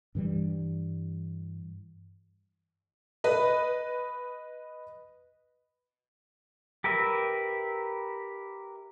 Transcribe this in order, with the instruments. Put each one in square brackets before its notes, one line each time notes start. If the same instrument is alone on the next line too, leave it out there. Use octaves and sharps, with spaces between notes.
[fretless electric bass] G2 E3 G3
[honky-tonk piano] B4 D#5
[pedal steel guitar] G4 A#4 B4 E5